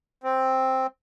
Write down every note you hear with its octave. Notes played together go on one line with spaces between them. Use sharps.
C4